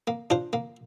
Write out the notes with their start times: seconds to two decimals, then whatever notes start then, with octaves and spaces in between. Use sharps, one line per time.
0.07 A#3
0.30 D4 F4 C5
0.53 A#3